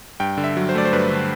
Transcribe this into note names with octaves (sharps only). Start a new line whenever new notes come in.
G2 G5
D3
E5
F#3
C5
A3 D5
C5
G2 B4
D3